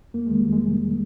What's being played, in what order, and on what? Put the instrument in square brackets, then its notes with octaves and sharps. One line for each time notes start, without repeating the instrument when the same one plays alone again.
[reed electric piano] F2 A#3
D#3 G#3
G3
F2
G#3
C3